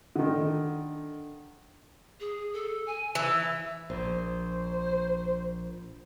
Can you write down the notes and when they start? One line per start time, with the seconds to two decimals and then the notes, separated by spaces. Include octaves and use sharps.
0.16 D3 D#3
2.20 G#4
2.53 A4
2.86 G#5
3.15 E3 E6
3.90 A#1 C5